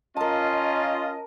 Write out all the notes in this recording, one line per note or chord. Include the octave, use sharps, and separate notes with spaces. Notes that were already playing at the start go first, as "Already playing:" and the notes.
C#4 F4 A#4 D#5 A5